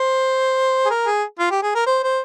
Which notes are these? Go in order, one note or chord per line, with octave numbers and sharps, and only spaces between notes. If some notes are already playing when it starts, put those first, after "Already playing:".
Already playing: C5
G#4
A#4
G#4
F4
G4
G#4
A#4
C5
C5